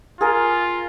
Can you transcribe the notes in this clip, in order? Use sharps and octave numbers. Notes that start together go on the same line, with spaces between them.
F4 G#4 A#4